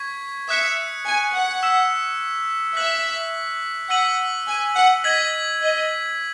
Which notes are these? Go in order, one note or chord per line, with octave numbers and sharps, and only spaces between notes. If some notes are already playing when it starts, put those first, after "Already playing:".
Already playing: C#6 G#6 B6
E5 D#6 F#6 C#7
G#5
F#5
E6 B6 E7
E5 F#6 B6 F#7
F#5 E6 B6 D#7 F#7
G#5
F#5
D#5 G#6 B6 F#7
D#5